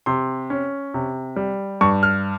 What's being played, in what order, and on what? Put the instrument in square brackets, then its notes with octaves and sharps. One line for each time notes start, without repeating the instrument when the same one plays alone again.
[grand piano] C3 C6
C#4
C3
G3
G2 C#6
F6